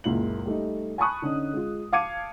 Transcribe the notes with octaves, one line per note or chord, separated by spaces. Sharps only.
F#1 C#2 A#2 E4 F#7
G3 A3 D#4
G#5 A5 B5 C#6 D#6 F#6
D3 C#4 D#4
G#3 F4
F5 A5 D6 G#6 C#7 D#7